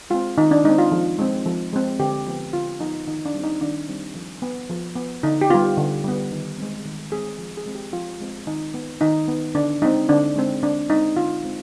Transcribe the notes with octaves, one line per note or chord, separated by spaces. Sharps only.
G#3 C4 F4
D#3 D#4
D4
G#3 C4 D#4
F4
F3
G#3 C4
F3
G#3 C4
D3 G4
F3 B3
D3 F4
F3 B3 D#4
D#3 D#4
D4
G3 C4
D#4
D#3 D4
G3 C4
F3
B3
F3
B3
D3 D#4
G4
G3 B3 F4
D3
G3 B3
D#3
G#3 C4
D#3
G#3 C4 G#4
F3
G#4
G#3 C4
G4
F3 F4
G#3 C4
D#3 D#4
B3
D#3 D#4
B3
D3 D4
G#3 C4 D#4
D3 D4
G#3 C4
D3 D4
G#3 C4 D#4
D3 F4
G#3 C4